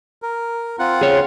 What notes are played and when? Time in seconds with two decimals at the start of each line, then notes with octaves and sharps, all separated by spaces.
0.22 A#4
0.79 C4 F4 F#5
1.01 G#4 C#5